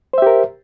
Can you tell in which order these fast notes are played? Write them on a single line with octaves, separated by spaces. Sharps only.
C5 E5 G4 A#4